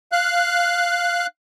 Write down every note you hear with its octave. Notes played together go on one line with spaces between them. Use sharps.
F5 F#6